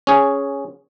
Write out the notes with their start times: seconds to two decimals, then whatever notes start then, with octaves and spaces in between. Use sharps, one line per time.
0.07 C#4 G#4